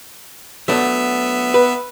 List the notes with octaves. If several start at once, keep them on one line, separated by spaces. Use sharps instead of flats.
F#3 A3 B3 D4 E5
B4